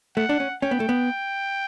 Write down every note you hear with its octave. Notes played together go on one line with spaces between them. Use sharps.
A3 F#5
D4
C#4
C#4 G5
B3
A3
B3